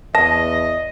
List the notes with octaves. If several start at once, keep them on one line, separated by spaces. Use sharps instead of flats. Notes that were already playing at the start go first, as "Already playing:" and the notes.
E2 D#5 A5 A#6